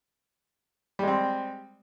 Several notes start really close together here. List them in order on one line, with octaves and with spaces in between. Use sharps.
G3 G#3 C4